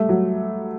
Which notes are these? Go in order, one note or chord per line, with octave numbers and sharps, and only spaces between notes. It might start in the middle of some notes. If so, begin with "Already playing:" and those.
Already playing: G3 A3
F#3